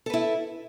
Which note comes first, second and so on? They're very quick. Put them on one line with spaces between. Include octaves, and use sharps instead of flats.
A4 B4 E4